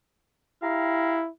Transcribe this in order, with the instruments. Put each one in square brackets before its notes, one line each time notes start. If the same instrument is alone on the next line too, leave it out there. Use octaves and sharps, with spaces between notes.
[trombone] E4 [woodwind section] G4 F5 A#5